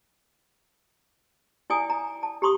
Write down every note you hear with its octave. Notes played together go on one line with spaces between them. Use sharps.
E4 D5 G5 G#5 D#6
A#5
A5
G4 A#5 C6 C#6 D#6